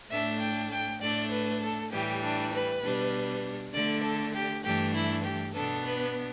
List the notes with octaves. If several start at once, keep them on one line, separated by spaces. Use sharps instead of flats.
A2 A3 D4 E5
G5
G5
A2 A3 D4 D5
B4
A4
A2 E3 G3 G4
D4
B4
B2 G3 D4
D3 A3 D4 D5
A4
G4
G2 E3 A3 D4 G4
E4
G4
B2 B3 D4 A4
B4